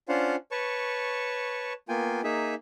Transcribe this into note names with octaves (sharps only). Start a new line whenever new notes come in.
C#4 D4 F4 C5 F5 F#5
B4 C#5 A5 C#6
A#3 B3 F4 G5 G#5
A#3 D#4 G#4 E5